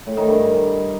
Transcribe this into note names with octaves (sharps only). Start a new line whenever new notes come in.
A2
D#3
G2